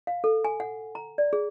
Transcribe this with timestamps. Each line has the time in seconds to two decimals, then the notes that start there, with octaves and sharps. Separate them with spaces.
0.07 F5
0.24 A4
0.45 G#5
0.60 F#5
0.95 A#5
1.18 D5
1.33 G#4